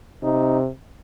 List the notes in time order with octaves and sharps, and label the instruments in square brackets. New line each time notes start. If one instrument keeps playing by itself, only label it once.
[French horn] C3 [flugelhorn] D#4